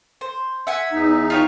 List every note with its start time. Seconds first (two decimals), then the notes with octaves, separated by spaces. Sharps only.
0.21 C5
0.67 E5 F#5 G#5
0.92 E2 D#4
1.30 F4 G4 C#5